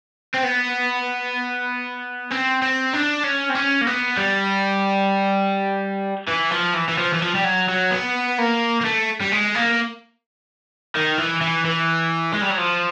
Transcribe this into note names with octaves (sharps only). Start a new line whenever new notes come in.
C4
B3
C4
C4
D4
C#4
C4
C#4
A#3
B3
G3
E3
F3
E3
E3
F3
E3
F3
G3
F#3
F#3
B3
A#3
A#3
A3
G3
G#3
A#3
D#3
E3
E3
E3
G#3
G3
F#3
F3